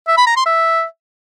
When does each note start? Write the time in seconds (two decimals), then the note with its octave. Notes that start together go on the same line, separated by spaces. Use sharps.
0.07 E5
0.17 B5
0.27 A#5
0.36 C6
0.46 E5